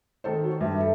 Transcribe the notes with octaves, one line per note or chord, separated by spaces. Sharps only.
D#3 A4 C5
F#4
G2 E5
A4